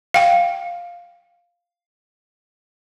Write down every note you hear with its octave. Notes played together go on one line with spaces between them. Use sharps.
F5 G5